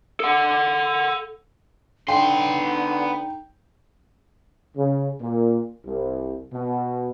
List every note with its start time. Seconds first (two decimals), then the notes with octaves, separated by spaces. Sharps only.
0.20 A4 F#5
2.08 D3 B3 D#4 G5 C6
4.76 C#3
5.20 A#2
5.84 C2
6.52 B2